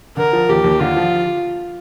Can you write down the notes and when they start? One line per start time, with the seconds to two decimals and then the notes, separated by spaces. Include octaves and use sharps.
0.17 D3 A#4
0.33 F3
0.49 D#2 G4
0.64 D#2
0.80 D3 F4
0.97 F3